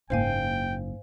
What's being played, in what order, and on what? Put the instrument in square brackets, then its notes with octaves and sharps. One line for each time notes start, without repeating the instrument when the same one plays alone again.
[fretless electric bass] F#1 [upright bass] G#2 A#3 [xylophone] C5 F5 G#5 [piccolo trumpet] G5